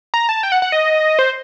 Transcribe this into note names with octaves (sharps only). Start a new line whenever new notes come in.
A#5
A5
G5
F#5
F#5
D#5
C5